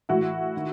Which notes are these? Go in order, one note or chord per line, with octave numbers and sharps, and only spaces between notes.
A2 E3 E4 F#4
D#3